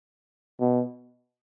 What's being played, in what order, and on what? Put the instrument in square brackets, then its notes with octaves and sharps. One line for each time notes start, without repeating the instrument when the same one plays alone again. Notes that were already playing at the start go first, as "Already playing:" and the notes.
[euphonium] B2